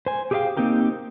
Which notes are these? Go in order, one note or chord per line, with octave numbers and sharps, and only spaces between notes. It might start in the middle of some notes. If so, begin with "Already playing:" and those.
C5 G#5
G4 G#4 B4 E5 F5 G5
A#3 C4 D#4 G4 A#4